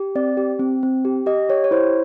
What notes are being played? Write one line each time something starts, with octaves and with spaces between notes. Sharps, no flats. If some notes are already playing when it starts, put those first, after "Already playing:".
Already playing: G4
C4 D5
G4
C4
C4
G4
G4 D#5
G4 C#5
C#5
E4 C5